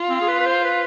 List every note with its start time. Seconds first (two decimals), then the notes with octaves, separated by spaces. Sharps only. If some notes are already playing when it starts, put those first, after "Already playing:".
Already playing: F4
0.09 C4
0.21 G#4
0.28 B4
0.40 B4
0.46 C5
0.65 B4